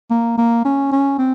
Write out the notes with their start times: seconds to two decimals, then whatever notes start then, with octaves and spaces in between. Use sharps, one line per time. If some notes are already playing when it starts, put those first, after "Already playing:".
0.10 A#3
0.38 A#3
0.65 C#4
0.92 C#4
1.19 C4